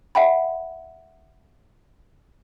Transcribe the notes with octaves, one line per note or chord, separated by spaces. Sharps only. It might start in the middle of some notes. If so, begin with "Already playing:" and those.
E5 F#5 G5 B5